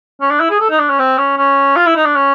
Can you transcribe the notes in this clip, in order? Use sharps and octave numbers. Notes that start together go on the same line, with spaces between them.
C#4
D4
E4
G#4
A4
D#4
D4
C#4
C4
C#4
C#4
F4
E4
D#4
D4
C#4